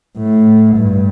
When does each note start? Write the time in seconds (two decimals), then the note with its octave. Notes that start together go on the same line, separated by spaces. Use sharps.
0.18 A2
0.76 G2